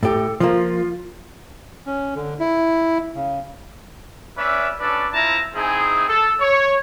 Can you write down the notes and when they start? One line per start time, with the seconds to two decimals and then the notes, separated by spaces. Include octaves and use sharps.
0.03 A2 G4 A4
0.40 F3 A#3 F4
1.86 C#4
2.15 D3
2.40 E4
3.15 C#3
4.37 C#4 B4 D5 E5
4.80 C#4 D4 F#4 A4 B4 D5
5.13 C4 E4 F4 E5 A5 A#5
5.55 C4 D#4 E4 G#4
6.08 A4
6.40 C#5